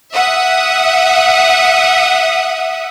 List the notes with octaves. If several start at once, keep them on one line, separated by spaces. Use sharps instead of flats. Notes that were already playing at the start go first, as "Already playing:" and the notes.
E5 F#5 D#6